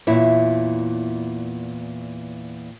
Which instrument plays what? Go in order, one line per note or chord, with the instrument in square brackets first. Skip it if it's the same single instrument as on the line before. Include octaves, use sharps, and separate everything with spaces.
[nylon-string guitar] E2 A#2 E4 C#5